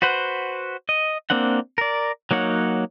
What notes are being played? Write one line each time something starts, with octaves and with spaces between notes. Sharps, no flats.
F#4 B4 C5 F#5
D#5
A#3 C4 D4 F#5
A#4 D5
F#3 A#3 D#4 C#5 F#5